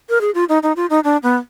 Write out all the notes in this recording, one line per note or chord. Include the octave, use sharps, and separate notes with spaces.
A#4
G#4
F4
D#4
D#4
F4
D#4
D4
B3